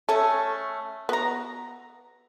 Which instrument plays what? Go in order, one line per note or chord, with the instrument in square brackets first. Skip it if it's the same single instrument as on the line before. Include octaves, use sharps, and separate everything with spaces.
[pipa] A3 C#4 G#5 [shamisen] A4
[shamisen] B3 [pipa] F#4 A#5